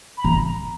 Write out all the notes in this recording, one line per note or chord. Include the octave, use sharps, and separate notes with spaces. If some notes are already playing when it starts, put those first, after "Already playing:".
B5
E3 A#5